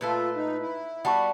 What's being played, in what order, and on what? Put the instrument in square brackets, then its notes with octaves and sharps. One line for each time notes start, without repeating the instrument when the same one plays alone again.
[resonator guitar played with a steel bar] A#2 A3 A4 [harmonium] F4 [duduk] B4
[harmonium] D#4
E4
[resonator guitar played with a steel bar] G3 B3 F#4 [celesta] F#5 A5 C#6